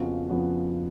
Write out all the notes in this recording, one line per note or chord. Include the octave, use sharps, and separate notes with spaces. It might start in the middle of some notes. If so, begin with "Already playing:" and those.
Already playing: F2 C#3 F3 B3 F#4
F2 C#3 F3 B3 F#4